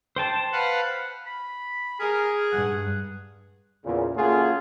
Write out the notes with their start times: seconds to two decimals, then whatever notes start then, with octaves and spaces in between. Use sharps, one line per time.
0.16 C5 G5 A5
0.52 B4 F5 F#5
1.26 B5
2.00 G#4 A#4
2.52 G2 F#5
3.85 E2 A#2 C#3
4.16 A3 A#3 C#4 F4 F#4 G#4